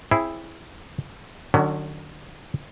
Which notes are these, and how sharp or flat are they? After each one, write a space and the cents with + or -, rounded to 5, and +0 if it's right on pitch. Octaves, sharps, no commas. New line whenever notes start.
C4 +25 E4 +0 G#4 +5
D3 +45 F#3 +0 C#4 +30